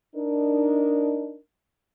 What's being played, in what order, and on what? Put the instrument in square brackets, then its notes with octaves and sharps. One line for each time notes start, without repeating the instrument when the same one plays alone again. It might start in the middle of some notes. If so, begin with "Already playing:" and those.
[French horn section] D4 D#4 A#4